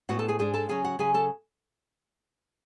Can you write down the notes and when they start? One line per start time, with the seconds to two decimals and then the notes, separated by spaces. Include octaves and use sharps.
0.09 A2 G#3 B3 D4 F#4 F#5
0.19 A4 A5
0.28 G#4 G#5
0.39 G#2 G#3 D4 G#4 G#5
0.54 A4 A5
0.69 C#3 F#3 C#4 G#4 G#5
0.84 F#4 F#5
0.99 C#3 F#3 C#4 G#4 G#5
1.14 A4 A5